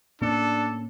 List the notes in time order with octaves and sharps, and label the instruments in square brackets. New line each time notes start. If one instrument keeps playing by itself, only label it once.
[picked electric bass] A2 A#3 C#4 [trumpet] D4 [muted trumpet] A4